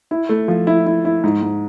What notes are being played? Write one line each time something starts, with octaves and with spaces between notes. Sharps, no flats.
E4
A3
F3
E4
E4
E4
G#2
G#2